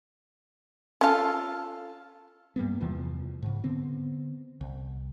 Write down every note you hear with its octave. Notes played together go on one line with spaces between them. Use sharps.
C#4 F4 A4 F5 A5
G2 G3 A#3 B3
E2 C3 E3 F3
G#2 C#3
D3 B3 C4
C2